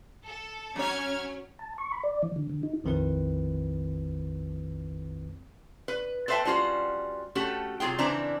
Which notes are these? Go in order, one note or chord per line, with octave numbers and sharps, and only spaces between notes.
A4
F#3 C#4 C#5 F6 G#6
A5
C#6
B5
D5
E3
D3
D3
D#4
A#1 F2 D#3 C4 E4 B4
B4
A4 B4 C5 E5 G5 A5
G3 C#4 F4 F#4 C5
A3 C#4 F#4 G4 A4
C3 F#3 F4 G#4 G5
C#3 E3 C4 D4 E4 A#5